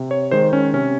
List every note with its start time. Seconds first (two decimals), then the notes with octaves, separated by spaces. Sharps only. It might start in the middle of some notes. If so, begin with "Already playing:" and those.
Already playing: C3
0.11 C#5
0.31 D#3 G#3 C5
0.53 C#4
0.73 C3 C#4